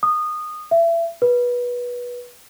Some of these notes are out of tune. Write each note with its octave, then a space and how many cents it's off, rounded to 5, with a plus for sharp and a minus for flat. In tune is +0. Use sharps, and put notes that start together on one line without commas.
D#6 -20
E5 +30
B4 -20